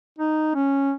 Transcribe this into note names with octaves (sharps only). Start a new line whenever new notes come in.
D#4
C#4